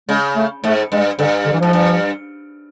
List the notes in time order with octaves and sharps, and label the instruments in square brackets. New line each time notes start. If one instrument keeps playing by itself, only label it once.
[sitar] C#3 [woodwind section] G#3
[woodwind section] A3
[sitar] G#2 [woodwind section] A3
[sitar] G2 [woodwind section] G#3
[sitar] G2 [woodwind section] D3
[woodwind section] D3
E3
[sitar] G#2 [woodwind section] F3
[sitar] G2